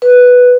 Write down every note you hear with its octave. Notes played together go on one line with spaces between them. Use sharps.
B4